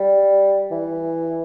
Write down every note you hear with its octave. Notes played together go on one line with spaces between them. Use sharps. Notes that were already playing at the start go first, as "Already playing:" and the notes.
Already playing: G3
E3